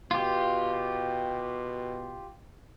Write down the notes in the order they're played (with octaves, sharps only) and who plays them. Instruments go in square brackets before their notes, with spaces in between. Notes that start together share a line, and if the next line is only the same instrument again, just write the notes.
[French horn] B2 [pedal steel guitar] F4 G4